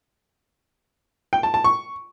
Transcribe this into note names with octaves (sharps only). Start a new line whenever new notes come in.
G5
A5
A5
C#6